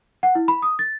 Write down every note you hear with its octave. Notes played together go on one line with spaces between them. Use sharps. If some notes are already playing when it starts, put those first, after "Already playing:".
F#5
E4
B5
D#6
A6